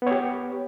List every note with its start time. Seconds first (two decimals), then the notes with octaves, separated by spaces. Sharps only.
0.02 B3
0.07 C#5
0.11 G4